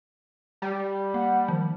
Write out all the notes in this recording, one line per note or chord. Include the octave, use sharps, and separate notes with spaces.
G3
A#3 F#5
D#3 F3